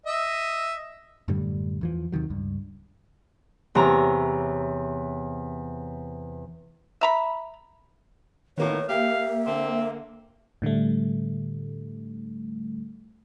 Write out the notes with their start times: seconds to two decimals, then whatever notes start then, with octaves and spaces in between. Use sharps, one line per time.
0.06 D#5 E5
1.28 F#2 A2 D3 G3
1.81 E2 E3 F3
2.12 D#2 C3 D#3 F#3
2.30 C#2 G2
3.75 E2 C3 C#5 A#5
7.01 E5 A#5 B5
8.58 A2 D#3 A#3 B3 C#5
8.89 A#3 G4 E5 F5
9.47 D3 C4
10.62 A2 D3 G3 A3